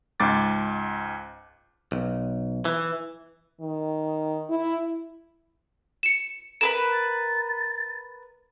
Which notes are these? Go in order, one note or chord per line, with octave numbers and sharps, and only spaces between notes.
C#2 G#2 D6 A6
B1
E3
D#3
E4
C#7 E7
A#4 B4 B5 E7
A6